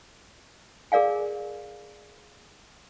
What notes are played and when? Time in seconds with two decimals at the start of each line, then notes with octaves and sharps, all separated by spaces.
0.92 G#4 A#4 D5 F5 G#5